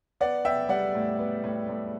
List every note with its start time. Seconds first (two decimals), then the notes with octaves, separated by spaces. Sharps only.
0.20 B3 D5 F#5
0.45 B3 E5 G5
0.69 G3 D5 F#5
0.95 A2
1.19 B3
1.44 A2
1.69 A2